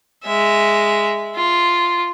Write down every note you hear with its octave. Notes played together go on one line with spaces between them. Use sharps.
G#3 E5
F4